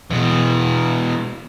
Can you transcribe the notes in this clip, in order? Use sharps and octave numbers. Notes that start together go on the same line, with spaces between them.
B2 E3